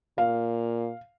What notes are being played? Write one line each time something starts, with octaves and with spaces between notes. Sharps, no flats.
A#2 F5